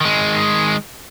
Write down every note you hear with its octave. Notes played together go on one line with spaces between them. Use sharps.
D#3 G#3